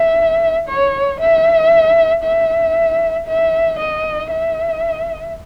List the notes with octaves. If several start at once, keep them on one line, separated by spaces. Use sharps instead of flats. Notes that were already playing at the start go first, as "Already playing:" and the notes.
Already playing: E5
C#5
E5
E5
E5
D#5
E5